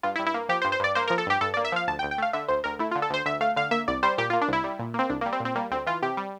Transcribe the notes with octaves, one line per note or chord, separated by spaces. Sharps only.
G2 F4
E4
G2
E4
A#3
F3 G4
C5
G2
C5
G2 D5
A#3 C5
F3 A#4
A4
G2 G4
G2 A4
D5
A#3
E5
F3 F5
D2 A5
G5
D2
G5
A3 F5
D3 E5
D2 C5
D2 A#4
A3 E4
F4
D3
A4
D2 C5
D2 E5
A3 F5
D3 F5
A#3 E5
C2 D5
G3 C5
A#2 G4
F4
A#3
D4
C2 E4
G3
A#2
A#3 C4
C2 D4
A#3
G3
C4
A#2
C4
G3 A#3
D2 C4
E3 F4
C3 G4
G3